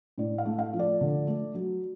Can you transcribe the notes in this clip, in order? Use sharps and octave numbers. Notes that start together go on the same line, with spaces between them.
A2 D5
F5
A3
F5
F3
D5
D3
A3
F#3